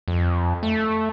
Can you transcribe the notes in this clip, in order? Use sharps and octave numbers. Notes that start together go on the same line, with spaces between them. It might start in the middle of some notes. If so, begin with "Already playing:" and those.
F2
A3